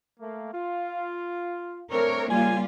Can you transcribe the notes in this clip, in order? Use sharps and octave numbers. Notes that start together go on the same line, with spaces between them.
A3 A#3
F4
A3 C4 D4 A#4 C#5
C#3 G3 A#3 F4 G#5